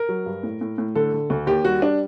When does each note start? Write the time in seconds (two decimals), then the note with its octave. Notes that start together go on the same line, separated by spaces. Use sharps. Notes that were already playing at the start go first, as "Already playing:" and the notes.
Already playing: A#4
0.09 F#3
0.26 G2
0.43 A2
0.61 A2
0.78 A2
0.95 D3 A4
1.13 D3
1.30 D2
1.47 D#2 G4
1.65 G3 F#4
1.82 D4